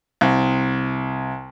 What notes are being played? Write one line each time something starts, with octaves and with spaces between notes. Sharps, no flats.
C2